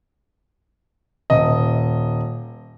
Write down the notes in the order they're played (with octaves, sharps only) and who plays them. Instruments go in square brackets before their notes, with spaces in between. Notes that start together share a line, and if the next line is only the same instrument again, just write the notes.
[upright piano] D#1 D#5